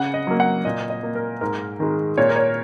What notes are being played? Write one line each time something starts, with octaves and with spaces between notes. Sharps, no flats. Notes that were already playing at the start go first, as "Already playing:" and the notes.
Already playing: C#3 F#5
D#5
F#3 A#3
F#5
A#2 D#5
D#5
A#3
A#4
G#2 A#4
D#3 G#3
A#2 C#5
A#4
C#5